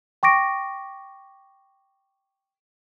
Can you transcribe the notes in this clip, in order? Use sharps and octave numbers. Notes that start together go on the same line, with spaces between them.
G5 C#6 D6 A#6 D7